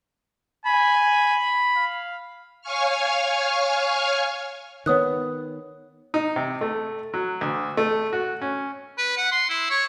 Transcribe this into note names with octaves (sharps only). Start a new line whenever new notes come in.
G#5 B5
F5
C#5 F5 G#5 C#6 F6
D#3 B3 C#5 D#6 F#6
D#4
C3
A3
F#3
D2
A3
F#4
C#4
B4
F#5
C6
E4
C#5